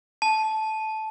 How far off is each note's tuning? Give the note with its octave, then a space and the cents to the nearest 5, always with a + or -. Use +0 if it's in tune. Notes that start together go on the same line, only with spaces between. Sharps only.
A5 -15